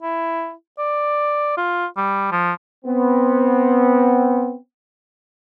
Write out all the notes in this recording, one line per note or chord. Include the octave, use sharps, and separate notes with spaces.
E4
D5
F4
G3
F3
B3 C4